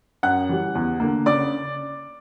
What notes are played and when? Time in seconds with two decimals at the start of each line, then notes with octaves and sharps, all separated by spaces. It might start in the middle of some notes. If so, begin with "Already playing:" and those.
0.23 F#2 F#5 F#6
0.49 E3 G3
0.75 E2
1.00 D3 A#3
1.26 C#3 D5 D6